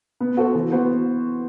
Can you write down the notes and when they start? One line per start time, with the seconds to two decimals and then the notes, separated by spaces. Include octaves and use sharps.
0.20 B3
0.37 F#4 A4 C5
0.55 E3
0.72 B3 F#4 C5